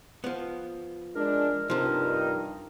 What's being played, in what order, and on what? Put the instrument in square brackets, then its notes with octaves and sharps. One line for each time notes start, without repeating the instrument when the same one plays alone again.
[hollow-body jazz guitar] F3 B3
[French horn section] G#3 D4 [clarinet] A#4
[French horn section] G2 D#4 [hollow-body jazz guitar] C3 F3 [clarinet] A#4